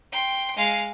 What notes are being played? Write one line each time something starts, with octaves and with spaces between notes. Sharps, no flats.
G5 C6
G#3 F5